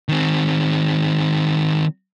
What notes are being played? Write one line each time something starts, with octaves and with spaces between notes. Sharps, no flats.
D#3 C4